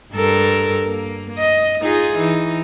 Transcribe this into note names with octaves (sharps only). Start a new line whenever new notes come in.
G2 A4 A#4
A#3
D#5
D#4 F4 G#4
E3 D#4